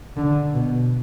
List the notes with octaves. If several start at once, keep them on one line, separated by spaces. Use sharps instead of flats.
D3
B2